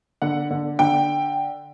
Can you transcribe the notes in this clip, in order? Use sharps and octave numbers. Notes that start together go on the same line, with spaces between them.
D3 F#5
D3
D3 G5